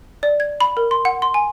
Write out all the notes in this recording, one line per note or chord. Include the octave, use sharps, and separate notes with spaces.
D5
G#6
B5
A#4
C6
F#5
C6
G#5